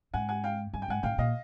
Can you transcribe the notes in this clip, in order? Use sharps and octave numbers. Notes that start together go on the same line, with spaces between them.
G#2 F#5 G#5
F#5 G#5
F5 G5
G2 G#5
G5
G#2 F#5 G#5
A2 F5 G5
A#2 D#5 F5